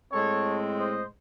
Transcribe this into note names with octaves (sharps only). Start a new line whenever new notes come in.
A2 G#3 C4 A4 C#5
C5 D#5